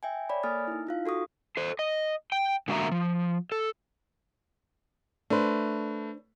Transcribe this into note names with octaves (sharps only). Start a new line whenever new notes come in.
E5 G5 G#5
C#5 D5 B5
A#3 A4 G#5 D#6 F6 A6
D#4 E4
D#4 F4 F5
F#4 A4 C#6 D#6
A4 C5
D#5
G5
D3 G#3 A#3 F#4 E5 A#5
F3
A4
A3 D4 B4 C5